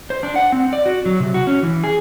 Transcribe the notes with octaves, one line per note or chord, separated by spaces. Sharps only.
C5
D4
F#5
C4
D5
F#4
F#3
C3
F#4
C#4
E3
G#4